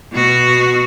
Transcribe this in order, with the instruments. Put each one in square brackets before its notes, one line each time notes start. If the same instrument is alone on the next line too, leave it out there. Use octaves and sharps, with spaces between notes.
[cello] B2 F#4